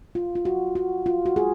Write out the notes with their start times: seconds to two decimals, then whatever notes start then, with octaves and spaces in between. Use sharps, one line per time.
0.15 F4
0.35 F4
0.45 F#4
0.75 F#4
1.06 F4
1.26 F#4
1.36 G#4